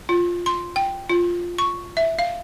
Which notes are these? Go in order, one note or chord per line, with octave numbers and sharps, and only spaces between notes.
F4
C6
G5
F4
C#6
E5
F5